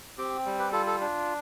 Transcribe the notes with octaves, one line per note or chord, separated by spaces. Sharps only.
C4 G4
G3
G4 B4
F4 A4
A4
D4